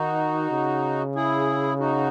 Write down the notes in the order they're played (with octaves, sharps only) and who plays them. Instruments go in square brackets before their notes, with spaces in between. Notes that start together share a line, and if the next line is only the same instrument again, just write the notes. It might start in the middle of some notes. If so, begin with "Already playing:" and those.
Already playing: [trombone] D#3 [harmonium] D#4 F#4
[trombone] C#3
[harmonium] E4 G#4
D#4 F#4